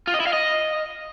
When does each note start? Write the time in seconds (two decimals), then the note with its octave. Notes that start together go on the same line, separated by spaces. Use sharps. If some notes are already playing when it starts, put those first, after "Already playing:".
0.07 F4
0.14 D#5
0.20 E4
0.27 F5
0.33 D#5